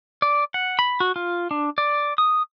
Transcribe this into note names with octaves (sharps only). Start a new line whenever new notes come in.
D5
F#5
B5
F#4
F4
D4
D5
D#6